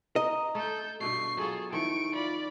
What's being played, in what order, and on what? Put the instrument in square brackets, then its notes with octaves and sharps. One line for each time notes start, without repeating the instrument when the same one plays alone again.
[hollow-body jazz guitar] D#5 [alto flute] A#5
[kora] A3 [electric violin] A4 G6
[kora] G2 B2 A3 [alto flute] C#6 [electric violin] C7
[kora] F#3 F4 [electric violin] G#4 A4
[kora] D#3 F3 A3 [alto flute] E4 [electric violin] C#6 D7
[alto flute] F4 [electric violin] D5 B5